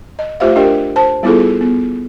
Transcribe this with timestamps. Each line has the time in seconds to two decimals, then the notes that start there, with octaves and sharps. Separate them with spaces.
0.19 D#5
0.40 A3 F4 G4 C5 E5 F5
0.56 D4 G4 A#4 D#5 G5
0.96 C5 A5
1.23 G3 B3 E4 F4 G#4 A4
1.61 B3